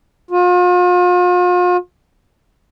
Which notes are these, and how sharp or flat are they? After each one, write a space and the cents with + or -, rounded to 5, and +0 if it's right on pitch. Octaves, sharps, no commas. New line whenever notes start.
F4 +40